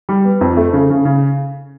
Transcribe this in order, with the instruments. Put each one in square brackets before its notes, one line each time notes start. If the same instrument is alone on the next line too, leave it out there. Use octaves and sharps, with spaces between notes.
[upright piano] G3
B3
F2
A3
C#3
C#3
C#3